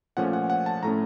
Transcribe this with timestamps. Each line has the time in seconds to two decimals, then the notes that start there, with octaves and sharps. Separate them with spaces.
0.17 A#2 F3 A3 C#4 F#5
0.33 F#5
0.50 F#5
0.66 A5
0.83 A2 A3 C#4 A#5